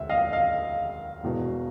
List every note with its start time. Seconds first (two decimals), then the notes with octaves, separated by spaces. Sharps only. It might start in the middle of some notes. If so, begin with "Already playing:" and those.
Already playing: E1 D2 E5
0.09 D#5 F5
0.32 D#5 F5
1.23 E1 E2 B2